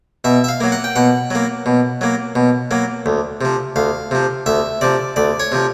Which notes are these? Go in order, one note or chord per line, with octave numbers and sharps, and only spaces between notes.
B2 E5
E5
F5
F#3 A#3
F#5
G5
B2 F#5
F#3 A#3
B2
F#3 A#3
B2
F#3 A#3
D2
C3 F3
D2 F5
C3 F3
D2 E5
C3 F3 D5
D2 D5
C#5
C3 F3